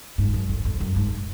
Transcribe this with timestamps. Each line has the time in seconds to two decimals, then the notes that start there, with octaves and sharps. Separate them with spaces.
0.18 G#2
0.34 F#2
0.49 F2
0.65 F2
0.80 F#2
0.96 G#2